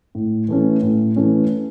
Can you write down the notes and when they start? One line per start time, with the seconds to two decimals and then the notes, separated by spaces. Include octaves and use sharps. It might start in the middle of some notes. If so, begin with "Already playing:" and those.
0.15 A2
0.48 E3 A3 C#4
0.82 A2
1.16 E3 A3 C#4